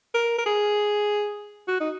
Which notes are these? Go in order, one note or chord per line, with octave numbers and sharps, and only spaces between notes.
A#4
A#4
G#4
F#4
D#4